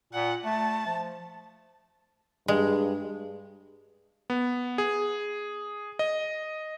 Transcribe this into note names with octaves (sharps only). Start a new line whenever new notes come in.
A#2 F#5
A3 A5
F3
G2 G#3
B3
G#4
D#5